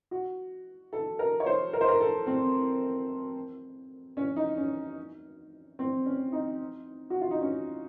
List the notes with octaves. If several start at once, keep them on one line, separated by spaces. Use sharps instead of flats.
F#4
A4
A#4
C#5
C5
A#4
C5
A#4
A4
C4
C#4
D#4
C#4
C4
C#4
D#4
F#4
F4
D#4
C#4